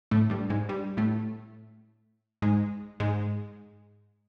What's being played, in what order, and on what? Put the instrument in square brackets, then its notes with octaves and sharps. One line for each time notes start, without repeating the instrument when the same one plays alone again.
[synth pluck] A2 A3
G2 G3
G#2 G#3
G2 G3
A2 A3
G#2 G#3
G#2 G#3